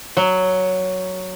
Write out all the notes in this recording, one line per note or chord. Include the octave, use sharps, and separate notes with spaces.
F#3